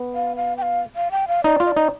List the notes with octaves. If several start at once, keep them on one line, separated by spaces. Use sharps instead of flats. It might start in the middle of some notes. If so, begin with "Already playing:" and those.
Already playing: B3
F5
F5
G5
F5
F5
G5
F5
D#4 D5
F4
D#5
D5
D#4